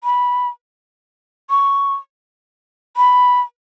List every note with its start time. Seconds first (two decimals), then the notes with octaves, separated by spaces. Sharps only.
0.04 B5
1.50 C#6
2.97 B5